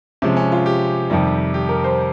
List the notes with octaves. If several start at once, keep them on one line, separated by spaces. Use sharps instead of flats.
C3 F3 G#3 C#4
C#4
F4
G4
F2 C3 D#3 G3
G4
A#4
C5